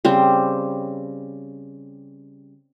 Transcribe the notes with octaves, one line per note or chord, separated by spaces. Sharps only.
C#3 G3 C4